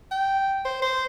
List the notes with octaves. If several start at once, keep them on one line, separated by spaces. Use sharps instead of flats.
G5
C5
C5